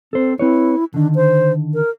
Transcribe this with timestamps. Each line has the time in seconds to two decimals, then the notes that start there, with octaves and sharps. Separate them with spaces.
0.13 C4 A4 C5
0.39 C4 E4 B4 C#5
0.94 D3 D#3 D4
1.15 C5
1.75 A#4